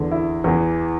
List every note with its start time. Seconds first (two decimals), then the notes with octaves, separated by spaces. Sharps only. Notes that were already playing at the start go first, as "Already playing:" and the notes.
Already playing: E2 D3
0.11 E4
0.44 E2 E3